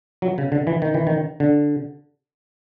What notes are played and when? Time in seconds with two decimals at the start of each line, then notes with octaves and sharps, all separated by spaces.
0.22 F#3
0.38 C#3
0.52 D3
0.67 E3
0.82 D#3
0.94 E3
1.07 D#3
1.40 D3